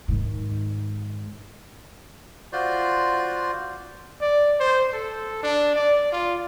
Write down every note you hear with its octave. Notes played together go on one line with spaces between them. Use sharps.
G#2 D#3
F4 F#4 C5 D5 C6
D5
C5
A4
D4
D5
F4